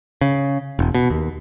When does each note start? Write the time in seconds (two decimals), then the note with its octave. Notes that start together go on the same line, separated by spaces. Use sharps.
0.21 C#3
0.79 E1
0.95 B2
1.10 D#2